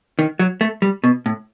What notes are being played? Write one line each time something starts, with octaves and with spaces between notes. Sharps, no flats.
D#3
F#3
A3
G3
B2
A2